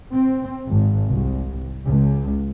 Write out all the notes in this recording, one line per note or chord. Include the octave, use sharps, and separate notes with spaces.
C4
G#1
C2
C#2